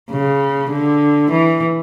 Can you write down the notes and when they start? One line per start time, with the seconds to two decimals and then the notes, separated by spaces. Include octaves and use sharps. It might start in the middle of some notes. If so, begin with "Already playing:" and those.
0.11 C#3
0.72 D3
1.31 E3